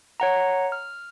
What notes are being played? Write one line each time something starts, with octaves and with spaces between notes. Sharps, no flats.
C#5 F#5 A#5
F6